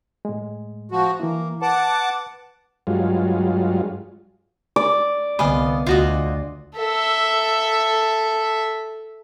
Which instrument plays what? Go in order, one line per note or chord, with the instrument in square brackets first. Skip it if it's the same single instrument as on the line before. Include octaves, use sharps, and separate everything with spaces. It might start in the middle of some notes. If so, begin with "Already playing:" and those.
[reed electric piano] A2 G#3
[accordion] F3 F#4
[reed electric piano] E3 E4 [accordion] A#3
[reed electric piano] B4 [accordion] F#5 A5 D6
[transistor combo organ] G2 F#3 G#3 F4
[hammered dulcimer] D5
[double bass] C2 B3 [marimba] D3 G#5 B5 [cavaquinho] D#5 F5
[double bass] D2 [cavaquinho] F4 F#4 D#5
[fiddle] A4 E5